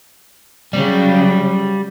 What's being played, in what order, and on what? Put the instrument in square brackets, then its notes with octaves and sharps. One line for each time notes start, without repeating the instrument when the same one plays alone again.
[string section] C#3 F#3 [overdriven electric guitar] G3